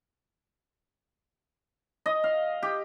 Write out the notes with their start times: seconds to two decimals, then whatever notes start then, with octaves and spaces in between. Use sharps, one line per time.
2.06 D#5
2.24 F5
2.63 G4